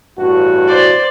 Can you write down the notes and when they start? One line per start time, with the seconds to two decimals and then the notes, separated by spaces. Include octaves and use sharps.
0.18 A1 G2 F#4
0.67 C5 D5